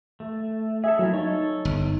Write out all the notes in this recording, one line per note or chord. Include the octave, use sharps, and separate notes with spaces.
A3
G#4 A4 E5
F#3 A#3 C#4 E4
D#4 A4 C#5
G1